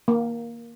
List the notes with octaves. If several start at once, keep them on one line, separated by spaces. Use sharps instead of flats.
A#3